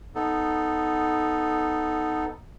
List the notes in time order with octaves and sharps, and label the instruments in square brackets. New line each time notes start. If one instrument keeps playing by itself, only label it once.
[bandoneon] B3 D#4 A4